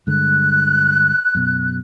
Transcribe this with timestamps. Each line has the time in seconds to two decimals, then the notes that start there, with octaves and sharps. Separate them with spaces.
0.07 G2 D3 G#3 F#6
1.35 F#2 B2